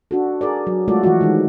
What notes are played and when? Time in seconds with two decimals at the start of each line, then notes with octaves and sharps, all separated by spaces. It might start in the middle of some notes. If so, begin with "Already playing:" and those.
0.11 D4 F#4 A4
0.41 G#4 A#4 D5
0.67 F#3
0.88 G#3 A3 F4 F#4 A4 D5
1.04 E3 F3 E4 F#4
1.21 D#3 E3 G#3